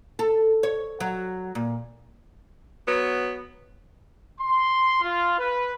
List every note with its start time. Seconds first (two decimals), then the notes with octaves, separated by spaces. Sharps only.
0.19 A4
0.63 C#5
1.00 F#3
1.55 A#2
2.88 F#3 B3
4.39 C6
5.01 F4
5.38 B4